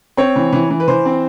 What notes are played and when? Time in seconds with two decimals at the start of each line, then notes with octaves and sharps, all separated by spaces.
0.17 C4 C#5
0.36 E3
0.53 E3
0.70 E3
0.80 B4
0.88 E3 C5
1.05 C4